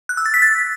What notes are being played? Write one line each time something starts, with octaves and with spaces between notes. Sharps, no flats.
F#6
E6
A6
B6
A6